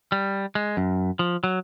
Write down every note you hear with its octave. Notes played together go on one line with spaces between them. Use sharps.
G3
G#3
F#2
F3
F#3